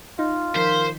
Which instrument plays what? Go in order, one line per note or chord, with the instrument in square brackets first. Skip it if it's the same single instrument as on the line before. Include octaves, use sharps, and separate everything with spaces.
[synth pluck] D#4 [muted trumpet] F4
[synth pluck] D#3 F3 B6 [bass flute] A#4 [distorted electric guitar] C5